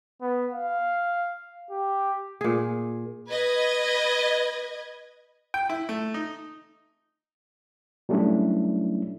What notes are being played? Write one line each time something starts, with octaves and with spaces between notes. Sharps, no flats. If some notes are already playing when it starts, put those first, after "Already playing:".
B3
F5
G4
A#2 G#4
B4 D#5 G#6
G5
E4
A3
D#4
F#3 G3 A3 C#4 D4 E4